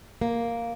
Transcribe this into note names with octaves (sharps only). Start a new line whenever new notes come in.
A#3